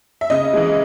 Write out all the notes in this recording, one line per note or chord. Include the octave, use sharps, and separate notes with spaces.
E5
C#3 D#5
E3 G#3